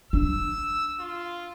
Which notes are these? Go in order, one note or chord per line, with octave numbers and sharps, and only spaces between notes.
D4 E6
F4